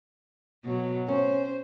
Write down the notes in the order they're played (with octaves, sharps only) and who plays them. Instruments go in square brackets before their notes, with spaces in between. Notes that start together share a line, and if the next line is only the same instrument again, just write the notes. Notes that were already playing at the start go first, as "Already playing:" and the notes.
[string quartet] B2 F#3
[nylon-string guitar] C#4 [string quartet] C5